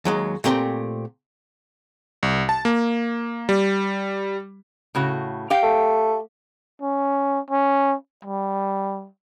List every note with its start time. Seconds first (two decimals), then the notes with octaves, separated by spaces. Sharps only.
0.05 D#2 F#3 G#3
0.44 A#2 A3 C4 G4 A#4 C6
2.23 C2
2.49 A5
2.65 A#3
3.49 G3
4.95 A2 C#3 F#4
5.50 G4 F5 G5
5.63 A3
6.82 C#4
7.50 C#4
8.25 G3